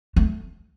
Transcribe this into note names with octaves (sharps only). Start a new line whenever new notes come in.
A3